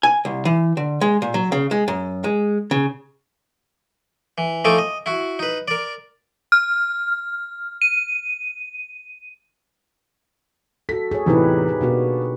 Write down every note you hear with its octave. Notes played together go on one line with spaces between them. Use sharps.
G#5
C2
E3
D3
G#3
A#2
F#3
C#3
G#3
F#2
G#3
C#3
E3
F3 A3 D#4 A4 G#5 D6
D#5
E4 F#4
D#4 B4
A#4 D5
F6
D#7
F#4 A4 B6
G#4 C#5
E2 A2 C3 D#4 G4 B4
B2 A#3 B3 D4 F#4